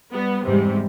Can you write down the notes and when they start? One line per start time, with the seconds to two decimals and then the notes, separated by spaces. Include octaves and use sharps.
0.14 G3 B3
0.46 E2 G#2 C3 G3